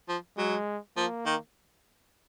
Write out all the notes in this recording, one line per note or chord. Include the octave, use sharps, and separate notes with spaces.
F3
F#3 G#3
F3 A#3
D#3